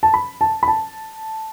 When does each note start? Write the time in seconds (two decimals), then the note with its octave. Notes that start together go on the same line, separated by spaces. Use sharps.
0.03 A5
0.14 B5
0.41 A5
0.63 B5
0.68 A5